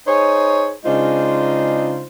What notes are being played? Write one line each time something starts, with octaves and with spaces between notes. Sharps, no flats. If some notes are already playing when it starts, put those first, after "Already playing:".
D#4 G#4 C5 C#5
C#3 G#3 D4 D#4 F4 C5